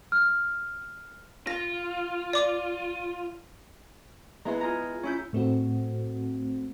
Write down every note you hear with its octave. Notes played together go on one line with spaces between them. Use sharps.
F6
F4 A#6
D5 D6
G#3 B3 E4 A#5 C6
F4 G#4 A#5
C#4 E4 G6
A2 A3 C4 F#4